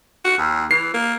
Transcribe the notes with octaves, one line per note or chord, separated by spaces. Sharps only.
F#4
D#2
E3 C7
A#3